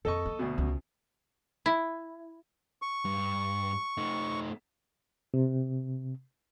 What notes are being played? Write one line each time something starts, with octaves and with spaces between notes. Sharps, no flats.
F2 A4 D#5 C#6
A#3
D2 B2
C#2
E4
C#6
G2
A3 D#4
C3